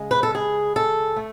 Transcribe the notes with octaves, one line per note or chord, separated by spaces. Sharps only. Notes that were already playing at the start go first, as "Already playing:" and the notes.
Already playing: C#3 G#3
B4
A4
G#4
A4
A3